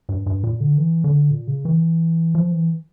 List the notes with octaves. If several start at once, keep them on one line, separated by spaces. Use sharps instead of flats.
G2
G2
A#2
D3
E3
D3
A#2
C#3
E3
F3
E3